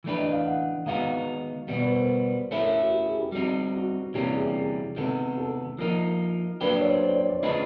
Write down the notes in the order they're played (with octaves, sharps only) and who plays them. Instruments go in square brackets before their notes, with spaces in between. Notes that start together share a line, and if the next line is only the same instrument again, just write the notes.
[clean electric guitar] E3 A3 D4 G4 B4
[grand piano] D#5
F5
F#5
[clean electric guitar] D#3 G#3 B3 D#4 F#4 [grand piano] F5
[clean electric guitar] B2 G3 B3
[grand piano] D5
B4
C5
A#4
[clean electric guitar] A3 C#4 E4 [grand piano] A4
[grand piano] A#4
A4
F#4
G4
G#4
G4
[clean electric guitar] G3 C4 D#4 [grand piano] F#4
[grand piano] F#4
[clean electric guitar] C3 E3 G3 A#3 C#4 [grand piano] G4
[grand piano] G#4
G#4
[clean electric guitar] C3 D#3 G#3 B3 [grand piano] A4
[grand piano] A4
[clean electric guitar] F3 A#3 D#4 [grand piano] A#4
[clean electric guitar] F#3 A#3 D4 G4 [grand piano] B4
[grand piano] C#5
C5
D5
C#5
D5
[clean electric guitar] A3 C#4 F4 G#4 B4 [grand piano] D#5